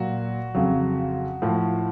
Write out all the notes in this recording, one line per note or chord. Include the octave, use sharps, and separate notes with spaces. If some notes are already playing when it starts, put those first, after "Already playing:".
Already playing: A#2 F#3 F#4
F2 C#3 F#3
A2 F3